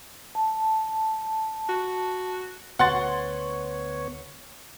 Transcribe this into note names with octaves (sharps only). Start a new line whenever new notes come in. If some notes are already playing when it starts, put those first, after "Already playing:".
A5
F#4
D2 B3 C#5 F#5 C6 A6